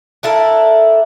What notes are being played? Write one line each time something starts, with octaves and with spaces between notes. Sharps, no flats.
D4 E4 A4 A#4